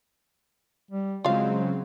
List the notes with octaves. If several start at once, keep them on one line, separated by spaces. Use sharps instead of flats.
G3
C#3 F#3 G#3 C4 F4 F5